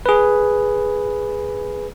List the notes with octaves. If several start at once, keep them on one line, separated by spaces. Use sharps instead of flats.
G#4 B4